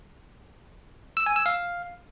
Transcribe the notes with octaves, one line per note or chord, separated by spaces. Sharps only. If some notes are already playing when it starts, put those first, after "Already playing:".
E6
G#5
E6
F5